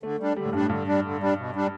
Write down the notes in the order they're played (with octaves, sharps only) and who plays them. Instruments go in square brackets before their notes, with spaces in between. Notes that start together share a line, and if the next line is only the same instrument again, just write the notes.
[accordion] D3 [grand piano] A3
[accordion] G3 D4
[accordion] D3 [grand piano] G3
[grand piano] A2
[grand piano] G2 [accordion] G3 D4
[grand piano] A2
[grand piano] G2 [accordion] D3
[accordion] G3 D4
D3
G3 D4
B2
G3 D4